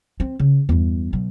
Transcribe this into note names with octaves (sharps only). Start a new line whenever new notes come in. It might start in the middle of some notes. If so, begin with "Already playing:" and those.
C4
C#3
E2 G2
B2 F#3